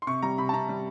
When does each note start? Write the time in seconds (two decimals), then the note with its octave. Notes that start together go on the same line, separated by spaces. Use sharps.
0.02 C6
0.07 C3 C#6
0.22 G3 A#5
0.38 C3 B5
0.49 A5
0.53 C3 A#5
0.69 G3